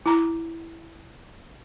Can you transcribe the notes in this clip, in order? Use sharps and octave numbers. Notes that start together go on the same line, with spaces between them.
E4 A#5